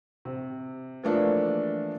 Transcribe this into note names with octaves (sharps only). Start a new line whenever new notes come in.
C3
E3 F3 A3 A#3 D4